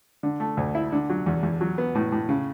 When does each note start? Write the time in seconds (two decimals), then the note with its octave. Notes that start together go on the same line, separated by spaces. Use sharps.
0.23 D3
0.40 A3
0.57 D2
0.75 E4
0.92 D3
1.10 F#3
1.26 E2
1.43 E2
1.61 F#3
1.78 B3
1.95 A2
2.12 A2
2.29 C#3